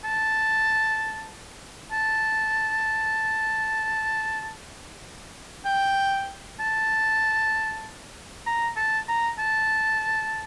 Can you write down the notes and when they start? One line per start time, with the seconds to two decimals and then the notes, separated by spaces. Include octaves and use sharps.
0.04 A5
1.92 A5
5.66 G5
6.60 A5
8.47 A#5
8.77 A5
9.08 A#5
9.39 A5